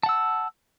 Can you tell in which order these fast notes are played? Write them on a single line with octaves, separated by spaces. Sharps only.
A5 F#5 E6